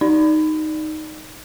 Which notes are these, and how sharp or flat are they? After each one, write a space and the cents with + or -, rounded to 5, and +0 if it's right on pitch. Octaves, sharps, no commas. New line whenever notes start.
D#4 +0 D5 +0